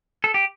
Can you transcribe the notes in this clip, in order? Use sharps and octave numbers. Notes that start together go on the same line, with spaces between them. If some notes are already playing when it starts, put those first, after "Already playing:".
A4
G4